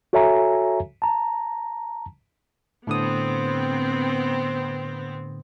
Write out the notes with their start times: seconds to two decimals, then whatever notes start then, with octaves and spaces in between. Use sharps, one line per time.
0.13 F#4 A4 C#5 E5 G#5 A#5
1.02 A5 A#5
2.87 A2 D3 B3 C4 D#6